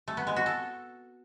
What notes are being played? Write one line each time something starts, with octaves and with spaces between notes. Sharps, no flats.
A3
B3
G#3
F#4
A4